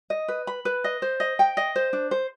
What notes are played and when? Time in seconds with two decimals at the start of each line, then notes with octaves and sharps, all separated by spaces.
0.10 D#5
0.28 B4
0.47 B5
0.65 B4
0.84 D#5
1.02 C5
1.20 D#5
1.39 G5
1.57 D#5
1.76 C5
1.93 D4
2.11 C5